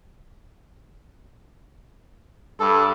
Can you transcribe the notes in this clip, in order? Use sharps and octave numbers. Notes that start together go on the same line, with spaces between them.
G2 A4